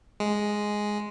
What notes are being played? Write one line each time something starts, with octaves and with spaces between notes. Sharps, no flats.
G#3